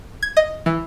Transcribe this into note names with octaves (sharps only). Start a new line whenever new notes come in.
G#6
D#5
E3